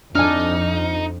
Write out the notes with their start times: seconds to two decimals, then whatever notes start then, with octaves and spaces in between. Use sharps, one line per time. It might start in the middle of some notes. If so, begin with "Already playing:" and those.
0.15 F2 D4 D#4 G#5 F6